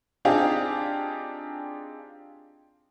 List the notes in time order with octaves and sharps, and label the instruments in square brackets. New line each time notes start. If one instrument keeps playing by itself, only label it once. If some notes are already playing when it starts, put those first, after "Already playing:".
[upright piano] C4 D4 D#4 F4 G4 G#4